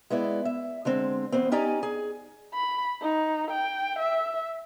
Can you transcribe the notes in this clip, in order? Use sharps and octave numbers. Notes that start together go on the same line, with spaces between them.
G#3 B3 E4 D5
E5
D3 G#3 C4
E2 B3 C4
C#4 D#4 G4 D5 G#5 A#5
G#4
B5
D#4
G5
E5